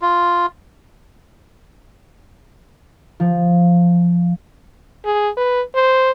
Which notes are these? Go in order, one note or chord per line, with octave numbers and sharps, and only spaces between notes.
F4
F3
G#4
B4
C5